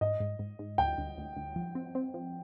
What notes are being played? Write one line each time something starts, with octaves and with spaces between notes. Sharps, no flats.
G#2 D#5
G#2
G#2
G#2
D2 G5
D2
D2
D2
F3
C4
C4
F3